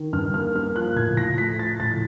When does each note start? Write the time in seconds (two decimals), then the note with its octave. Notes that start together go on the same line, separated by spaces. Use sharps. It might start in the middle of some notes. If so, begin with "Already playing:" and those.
Already playing: D#3
0.13 G2 F6
0.34 A#3 F6
0.55 A#3 F6
0.76 F3 F#6
0.96 A2 G#6
1.17 A2 A#6
1.38 A3 B6
1.59 F3 A6
1.80 A2 A6